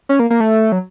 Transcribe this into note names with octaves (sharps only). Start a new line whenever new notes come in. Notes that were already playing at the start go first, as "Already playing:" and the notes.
C#4
A#3
A#3
A3
F#3